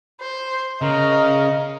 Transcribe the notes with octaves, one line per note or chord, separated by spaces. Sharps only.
C5
C#3 A#4 D#5